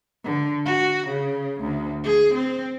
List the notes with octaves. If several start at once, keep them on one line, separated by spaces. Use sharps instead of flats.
D3
F#4
C#3
D2
G#4
C4